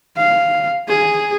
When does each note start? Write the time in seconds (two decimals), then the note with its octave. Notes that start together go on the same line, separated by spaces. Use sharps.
0.17 F5
0.88 G#4